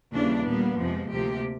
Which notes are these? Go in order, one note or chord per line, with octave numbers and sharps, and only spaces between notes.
D#2 C#3 E3 G3 A#3 D4
A#2 G3 A#3 B3
F2 C3 F3 G#3
D2 C3 F3 A#3 G4